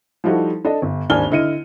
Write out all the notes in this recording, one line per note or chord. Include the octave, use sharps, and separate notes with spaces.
F3 G3 D#4 E4 F#4 A4
D4 A4 D#5
G1
D#1 G#1 D4 G#5 F6 G7
D3 E4 D#5 C#7 D#7